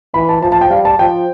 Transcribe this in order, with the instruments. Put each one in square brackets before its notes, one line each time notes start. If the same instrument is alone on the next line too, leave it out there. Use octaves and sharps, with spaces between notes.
[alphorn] E3 [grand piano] B5
[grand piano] A5
[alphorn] F3 [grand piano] A5
[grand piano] A5
G5
[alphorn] G3 [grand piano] F5
[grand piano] A5
[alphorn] F3 [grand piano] G5